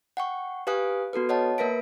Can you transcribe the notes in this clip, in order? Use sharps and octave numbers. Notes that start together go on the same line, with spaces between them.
F#5 G5 C#6
G4 B4 F5 G#5 D#6 F#6
B3 F#4 A4 B4
C#5 D#5 F#5 A5
A#3 A#4 B4 E5 B6 D7